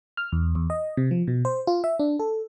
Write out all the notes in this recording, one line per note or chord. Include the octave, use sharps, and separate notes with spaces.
F6
E2
E2
D#5
C3
F3
B2
C5
F4
E5
D4
A4